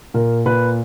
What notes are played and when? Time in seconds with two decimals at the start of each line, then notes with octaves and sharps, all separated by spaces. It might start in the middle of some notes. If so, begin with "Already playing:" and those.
0.14 A#2 A#4
0.46 A#2 B4